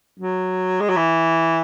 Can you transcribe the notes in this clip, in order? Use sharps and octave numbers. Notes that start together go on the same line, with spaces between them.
F#3
G#3
F#3
E3